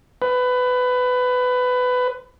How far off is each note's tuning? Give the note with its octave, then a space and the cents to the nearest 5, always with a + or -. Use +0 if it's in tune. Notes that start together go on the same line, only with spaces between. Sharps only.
B4 +20